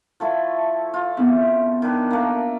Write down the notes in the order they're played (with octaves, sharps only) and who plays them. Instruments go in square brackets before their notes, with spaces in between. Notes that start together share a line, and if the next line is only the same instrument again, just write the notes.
[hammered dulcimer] F3 A3 E4
F4
[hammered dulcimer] C#3 [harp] B3 C4 E4
[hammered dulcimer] D#3 D4 B4
A3 A#3